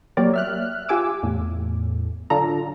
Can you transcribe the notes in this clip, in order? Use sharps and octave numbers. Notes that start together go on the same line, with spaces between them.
F#3 A#3 G4 A#4 C#5 D5
E5 F6 F#6
F4 G4 G#5 D6 E6
E2 A2
D3 F#3 D4 F4 A4 A#5